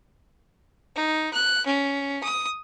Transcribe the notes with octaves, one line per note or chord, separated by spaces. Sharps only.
D#4
F#6
C#4
D#6